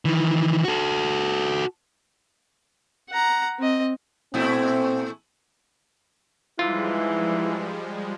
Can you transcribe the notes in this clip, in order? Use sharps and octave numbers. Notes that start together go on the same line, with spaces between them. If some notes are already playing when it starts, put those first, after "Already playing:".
D#3 E3
F#4 A4
F#5 A#5
C4 D#5
A#2 A3 C4 E4
G#2 E3 F3 G3 G#3 E4 F4